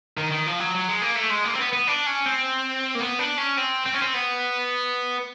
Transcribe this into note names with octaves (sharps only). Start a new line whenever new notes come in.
D#3
D#3
F3
F#3
F#3
G#3
A#3
A3
G#3
A#3
C4
B3
B3
D4
C#4
C4
A#3
B3
D4
C#4
C4
C4
C#4
C4
B3